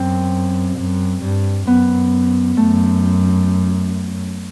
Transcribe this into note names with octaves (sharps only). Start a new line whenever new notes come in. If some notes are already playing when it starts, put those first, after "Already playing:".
Already playing: F#2 C4
F#2
G2
F#2 B3
F#2 A3